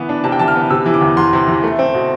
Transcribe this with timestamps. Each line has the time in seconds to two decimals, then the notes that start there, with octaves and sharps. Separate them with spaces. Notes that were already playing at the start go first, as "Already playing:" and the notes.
Already playing: E3 B3
0.09 D4
0.24 C3 A5
0.32 G5
0.39 E3 A5
0.48 F6
0.55 B3
0.70 C3 E6
0.86 E3
0.94 D6
1.01 E2
1.17 E2 C6
1.33 C3
1.48 E3
1.64 A3
1.79 C4
1.94 B2